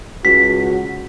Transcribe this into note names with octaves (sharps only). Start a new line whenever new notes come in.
C#2 F#4 B6